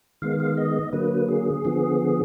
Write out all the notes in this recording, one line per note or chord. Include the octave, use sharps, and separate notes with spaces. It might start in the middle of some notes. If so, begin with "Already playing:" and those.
D#3 G#3 B3 F5
F5
D#5
D3 F#3 A#3 B4
G#4
D3 F3 B3